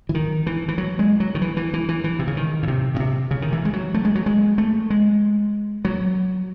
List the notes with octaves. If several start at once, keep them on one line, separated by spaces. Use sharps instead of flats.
E3
D#3
E3
E3
F#3
G#3
F#3
D#3
E3
E3
E3
E3
E3
C3
C#3
D#3
A2
C3
A2
C3
C#3
D#3
E3
G#3
F#3
A3
G#3
F#3
G#3
A3
G#3
F#3